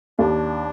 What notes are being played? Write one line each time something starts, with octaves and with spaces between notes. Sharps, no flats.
D#2 D4